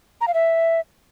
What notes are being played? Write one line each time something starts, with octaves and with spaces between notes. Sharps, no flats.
A#5
F5
E5